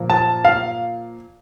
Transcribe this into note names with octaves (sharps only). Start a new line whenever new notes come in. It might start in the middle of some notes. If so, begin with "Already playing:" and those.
Already playing: A#2 F3 A#3
A5
F5